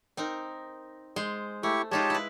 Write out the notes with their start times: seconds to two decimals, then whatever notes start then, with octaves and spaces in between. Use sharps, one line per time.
0.17 C4 D#4 A#4
1.16 G#3 C5
1.63 A3 E4 G4 C#6
1.91 G#3 D#4 F4 G4 C#5 A5
2.10 E4 B4